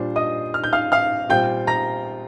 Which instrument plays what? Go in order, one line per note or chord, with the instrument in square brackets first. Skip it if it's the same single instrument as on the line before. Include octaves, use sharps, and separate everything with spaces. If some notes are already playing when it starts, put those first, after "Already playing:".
Already playing: [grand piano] A#2 G3 D4 F4 C5
D#5 D#6
F6
G6
F5 F6
F5 F6
A#2 G3 C4 F4 G5 G6
A#5 A#6